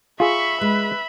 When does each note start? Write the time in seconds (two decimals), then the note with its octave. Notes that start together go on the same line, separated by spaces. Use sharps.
0.20 F4 G#4 E5 B5 C#6
0.61 G#3 B4